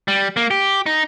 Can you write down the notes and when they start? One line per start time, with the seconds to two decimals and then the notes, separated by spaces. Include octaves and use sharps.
0.08 G3
0.37 A#3
0.51 G4
0.86 D#4